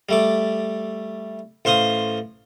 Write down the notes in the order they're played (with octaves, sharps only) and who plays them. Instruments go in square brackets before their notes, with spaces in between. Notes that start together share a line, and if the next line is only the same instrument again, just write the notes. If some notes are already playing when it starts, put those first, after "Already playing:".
[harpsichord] G3 A3 D6
A1 C5 F5 C6 D#6